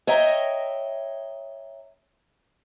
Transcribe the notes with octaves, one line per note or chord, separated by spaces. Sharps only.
C#5 D#5 E5 G5 A#5